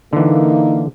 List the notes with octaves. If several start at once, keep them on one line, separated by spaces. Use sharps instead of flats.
D3 E3 A#3 D#4